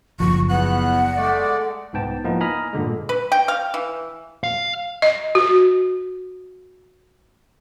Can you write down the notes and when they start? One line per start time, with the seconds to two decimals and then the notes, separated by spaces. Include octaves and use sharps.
0.20 F#1 F3 C#6
0.49 E2 B3 F#5 F#6
1.16 G#3 A3 D5
1.93 C2 G#2 B3 G5 A5
2.24 F3 A#3 B3 D#4 E4
2.41 D#5 G#5 A#5 B5 D#6 F6
2.73 G2 A#2 D3 G#3
3.09 B4
3.32 G5
3.48 F5
3.74 E3
4.44 F5
5.02 D#5
5.35 F#4